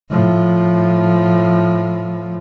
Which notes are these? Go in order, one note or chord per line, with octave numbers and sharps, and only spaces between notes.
A2 F3